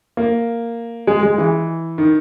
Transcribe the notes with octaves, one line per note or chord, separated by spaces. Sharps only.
A#3
G#3
G#3
E3
D#3